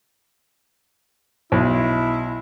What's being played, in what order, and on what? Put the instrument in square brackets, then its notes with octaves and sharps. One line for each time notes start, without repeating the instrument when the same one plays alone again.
[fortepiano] B1 [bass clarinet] E4